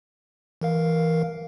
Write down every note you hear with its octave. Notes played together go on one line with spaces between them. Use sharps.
E3 A#4 F5